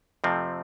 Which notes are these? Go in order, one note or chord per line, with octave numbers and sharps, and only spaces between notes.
F2 C3 F3 A3 C4